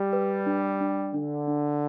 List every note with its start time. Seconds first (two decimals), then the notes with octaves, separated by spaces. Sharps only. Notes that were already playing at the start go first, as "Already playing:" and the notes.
Already playing: G3
0.13 B4
0.46 D4
0.81 D4
1.14 D3 D4
1.47 D4